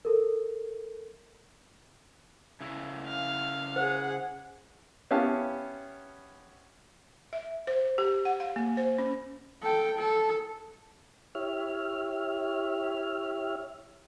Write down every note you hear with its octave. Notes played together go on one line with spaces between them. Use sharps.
A4 A#4
C#3 E4
F5
G#4 C5 F#5
B3 C#4 E4 G4 F5 A5
E5
C5
G4
F#5
F5
A#3
C5
C#4
A4 G5
A4
E4 G4 C#5 E5 F6